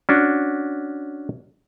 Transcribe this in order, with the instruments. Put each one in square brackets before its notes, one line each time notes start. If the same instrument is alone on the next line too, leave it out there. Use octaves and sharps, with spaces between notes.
[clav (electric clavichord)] C#4 D4 F#4